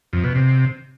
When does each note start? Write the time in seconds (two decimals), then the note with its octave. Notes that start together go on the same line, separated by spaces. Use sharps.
0.13 F2
0.24 B2
0.35 C3